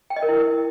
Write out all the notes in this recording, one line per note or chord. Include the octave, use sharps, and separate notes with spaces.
G5
D#5
A#4
E4